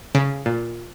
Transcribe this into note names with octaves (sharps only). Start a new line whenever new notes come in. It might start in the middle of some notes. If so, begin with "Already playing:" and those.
C#3
A#2